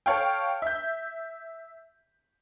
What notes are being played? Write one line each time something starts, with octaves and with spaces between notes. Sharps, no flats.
A4 C#5 F5 G5
E5 G6